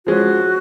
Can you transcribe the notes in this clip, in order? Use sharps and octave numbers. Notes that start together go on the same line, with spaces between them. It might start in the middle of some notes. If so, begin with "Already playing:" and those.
F3 G#3 C#4 F#4